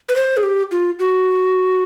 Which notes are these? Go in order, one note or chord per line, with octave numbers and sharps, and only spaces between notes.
B4
C5
G#4
G4
F4
F#4